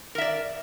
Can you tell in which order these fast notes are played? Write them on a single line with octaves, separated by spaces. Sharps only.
A#4 E5 D5